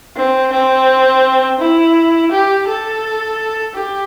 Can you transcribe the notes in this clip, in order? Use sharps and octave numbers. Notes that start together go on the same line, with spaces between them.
C4
C4
E4
G4
A4
G4